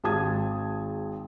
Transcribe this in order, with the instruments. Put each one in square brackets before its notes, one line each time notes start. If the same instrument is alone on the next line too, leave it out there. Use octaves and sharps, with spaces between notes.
[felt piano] G#1 G#2 D#3 A5 D#6 G#6